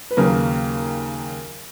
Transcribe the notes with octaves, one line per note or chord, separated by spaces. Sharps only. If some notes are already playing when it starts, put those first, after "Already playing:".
B4
D#2 C#3 F#3 A#3 A#4